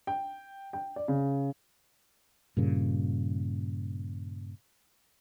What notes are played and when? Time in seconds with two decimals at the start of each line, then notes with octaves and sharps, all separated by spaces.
0.07 G5
0.73 G5
0.96 D5
1.08 C#3
2.57 G2 A#2 C#3